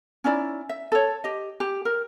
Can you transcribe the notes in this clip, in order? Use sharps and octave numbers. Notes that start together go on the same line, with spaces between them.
C#4 D#4 E4 D5
E5
A4 C#5
G4 D#5
G4
A#4